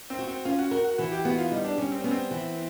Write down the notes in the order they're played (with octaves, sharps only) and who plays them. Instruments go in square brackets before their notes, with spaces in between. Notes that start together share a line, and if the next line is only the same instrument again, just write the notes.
[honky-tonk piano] C4
[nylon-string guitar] F#4
[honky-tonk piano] C4
[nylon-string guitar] C#4 [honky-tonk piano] F4
[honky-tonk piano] F#4
[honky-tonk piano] F#4 [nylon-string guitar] A#4
[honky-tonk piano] F#4
[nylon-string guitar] E3 [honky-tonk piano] F#4
[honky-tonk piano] G4
[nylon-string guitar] B3 [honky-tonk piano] F#4
[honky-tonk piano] F4
[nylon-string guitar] G3 [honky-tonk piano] D#4
[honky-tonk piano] D4
[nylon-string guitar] G3 [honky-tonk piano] C#4
[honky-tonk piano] C4
[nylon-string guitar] B3 [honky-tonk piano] C#4
[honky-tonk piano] C4
[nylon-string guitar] E3